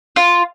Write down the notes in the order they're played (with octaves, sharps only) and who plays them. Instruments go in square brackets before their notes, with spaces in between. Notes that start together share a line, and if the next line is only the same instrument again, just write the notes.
[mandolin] F4